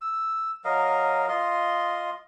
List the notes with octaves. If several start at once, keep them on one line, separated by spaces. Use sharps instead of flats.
E6
F#3 A#4 D#5 F5
F4 D#5 C6